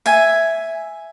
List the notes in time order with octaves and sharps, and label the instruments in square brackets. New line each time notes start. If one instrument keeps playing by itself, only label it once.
[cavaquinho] E5 G#5